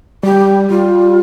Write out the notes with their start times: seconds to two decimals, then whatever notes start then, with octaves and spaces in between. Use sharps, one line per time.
0.23 G3 G4
0.70 G3 F4